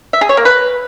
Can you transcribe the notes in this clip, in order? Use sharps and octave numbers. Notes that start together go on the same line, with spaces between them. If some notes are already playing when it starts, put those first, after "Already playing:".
E5
G#4
C#5
A#3
B4